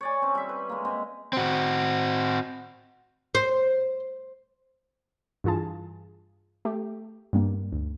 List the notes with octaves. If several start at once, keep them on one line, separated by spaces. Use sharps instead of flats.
C#5 D5 G#5
C4 C#4
G3 E5
B4
G#3 A#3
G#3 C4 D#5
C4 F#4
C5
G2 E3 F4 G#4 A5
A3 G4
G2 G3 A#3
D2